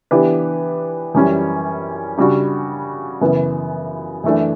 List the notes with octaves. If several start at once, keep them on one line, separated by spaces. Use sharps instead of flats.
E3 B3 D4 G4 B4
F#2 E3 G3 C#4
C#3 G3 D4 F#4
F#2 C#3 E3 B3
F#2 E3 A3 D4